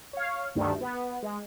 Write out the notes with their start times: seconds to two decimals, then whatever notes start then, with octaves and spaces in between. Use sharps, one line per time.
0.13 C#5 F5
0.55 D2 G2 D3 D#3 G3 A3
0.81 B3
1.23 G#3